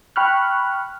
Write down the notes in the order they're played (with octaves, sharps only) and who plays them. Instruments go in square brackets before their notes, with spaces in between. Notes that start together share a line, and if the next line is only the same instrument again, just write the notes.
[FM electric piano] G5 B5 C#6 F6 F#6